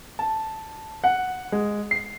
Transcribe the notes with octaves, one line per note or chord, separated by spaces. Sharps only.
A5
F#5
G#3
C7